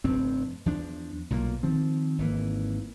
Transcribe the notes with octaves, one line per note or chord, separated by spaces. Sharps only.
F1 G2 C4
E2 F3 D4
B1 A#2 G3 A#3
D#3 F3 C4
G#1 E3 A#3